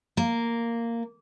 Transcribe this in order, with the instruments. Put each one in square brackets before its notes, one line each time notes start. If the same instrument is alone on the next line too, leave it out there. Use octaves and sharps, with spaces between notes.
[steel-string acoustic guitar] A#3